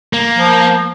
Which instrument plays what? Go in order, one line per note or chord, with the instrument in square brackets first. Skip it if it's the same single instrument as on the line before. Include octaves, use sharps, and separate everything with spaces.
[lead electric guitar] A#3
[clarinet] F3